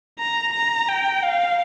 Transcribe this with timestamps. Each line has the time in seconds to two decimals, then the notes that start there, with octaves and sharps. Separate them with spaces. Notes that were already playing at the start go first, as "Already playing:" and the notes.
0.19 A#5
0.54 A#5
0.88 G5
1.23 F5